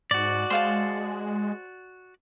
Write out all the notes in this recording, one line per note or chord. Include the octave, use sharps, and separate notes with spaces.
G#2 F#4 D5
G#3 C5 F5 A5